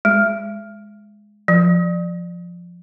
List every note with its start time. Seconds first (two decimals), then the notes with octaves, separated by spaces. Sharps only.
0.05 G#3
1.48 F3